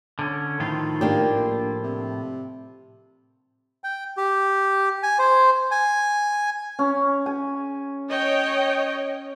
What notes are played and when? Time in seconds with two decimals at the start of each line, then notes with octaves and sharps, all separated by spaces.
0.19 D3 C#4
0.60 A2 D#3 F3 F4
1.01 A#3 D4 G4
1.36 A#1
1.83 C3
3.84 G5
4.17 G4
5.03 G#5
5.19 C5
5.71 G#5
6.79 C#4
7.26 G#5
8.08 C#5 D#5 G5